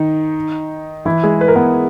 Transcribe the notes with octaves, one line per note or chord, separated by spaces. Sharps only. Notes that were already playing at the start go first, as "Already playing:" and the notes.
Already playing: D#3 D#4
E3 E4
G#3 G#4
B4
A#4
B3 B4